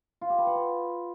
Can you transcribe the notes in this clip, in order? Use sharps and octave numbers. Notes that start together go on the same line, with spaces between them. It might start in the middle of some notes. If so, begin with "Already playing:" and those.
F4
G4
B4
F#5
F4